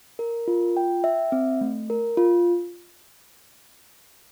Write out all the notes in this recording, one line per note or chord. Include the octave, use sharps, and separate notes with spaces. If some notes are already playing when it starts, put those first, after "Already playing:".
A#4
F4
G5
E5
C4
A3
A#4
F4